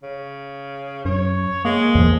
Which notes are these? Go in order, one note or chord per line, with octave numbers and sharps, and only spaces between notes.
C#3
F#2 C#5
G#3 A#3
E2 F3